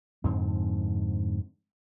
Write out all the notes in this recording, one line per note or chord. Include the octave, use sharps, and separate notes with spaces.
F2 G#2 D3 C4